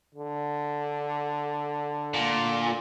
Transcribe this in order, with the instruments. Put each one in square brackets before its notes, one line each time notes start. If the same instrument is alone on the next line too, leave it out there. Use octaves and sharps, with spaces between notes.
[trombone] D3
[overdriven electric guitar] A#2